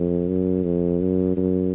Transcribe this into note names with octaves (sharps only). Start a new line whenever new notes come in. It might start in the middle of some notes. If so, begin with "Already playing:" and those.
Already playing: F2
F#2
F2
F#2
F#2